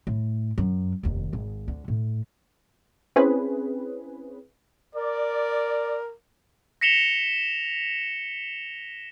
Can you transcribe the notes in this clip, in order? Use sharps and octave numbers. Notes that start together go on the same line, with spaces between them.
A2
F#2
F1 D#2
G#1
D2 D3
A2
C4 C#4 E4 G#4 B4
A#4 D5
A#6 B6 C#7 E7 F7 G7